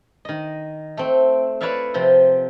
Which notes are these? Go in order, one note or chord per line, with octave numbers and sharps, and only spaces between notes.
D#3 D#5
A3 C4
E4 B4 C#5 D5 E5 F5
C3 F3 C4